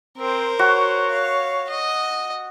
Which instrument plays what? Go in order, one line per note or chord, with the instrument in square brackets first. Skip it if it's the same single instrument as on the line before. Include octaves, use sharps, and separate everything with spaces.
[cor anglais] C4 [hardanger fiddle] A#4 C5
[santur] F#4 [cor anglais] C#5
[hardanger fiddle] F5
D#5